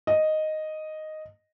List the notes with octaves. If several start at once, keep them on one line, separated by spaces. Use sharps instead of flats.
D#5